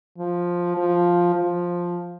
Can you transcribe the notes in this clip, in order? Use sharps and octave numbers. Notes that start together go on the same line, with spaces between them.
F3
F3
F3